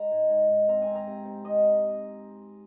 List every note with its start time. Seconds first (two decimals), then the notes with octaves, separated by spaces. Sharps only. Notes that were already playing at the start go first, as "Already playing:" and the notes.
Already playing: G#3 A#5
0.11 G#2
0.30 G#2
0.49 G#2
0.68 C4 A#5
0.82 G#5
0.87 C4
0.95 A#5
1.07 C3
1.25 C3
1.44 C4 D#5